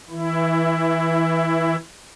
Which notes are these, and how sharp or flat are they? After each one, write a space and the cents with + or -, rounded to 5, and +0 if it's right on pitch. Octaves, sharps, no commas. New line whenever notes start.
E3 -20 E4 +15